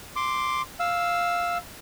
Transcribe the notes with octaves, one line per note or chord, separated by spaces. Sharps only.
C6 D6
F5 E6